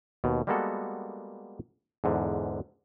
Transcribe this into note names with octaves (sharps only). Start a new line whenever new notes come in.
D#2 B2
G3 G#3 A#3 B3 F#4 A4
E2 G#2 D3